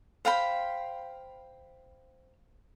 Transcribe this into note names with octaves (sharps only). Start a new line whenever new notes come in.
C5 F5 G5 B5